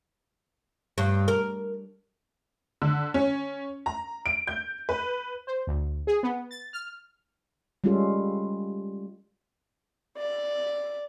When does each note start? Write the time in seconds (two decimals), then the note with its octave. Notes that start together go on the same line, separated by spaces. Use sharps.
0.98 G2
1.28 A#4
2.82 D3
3.14 C#4
3.86 A#5
4.26 D7
4.47 G6
4.89 B4
5.47 C5
5.67 D2
6.07 G#4
6.23 B3
6.51 A6
6.73 F6
7.84 G3 G#3 C#4 F4 G4 A4
10.18 D5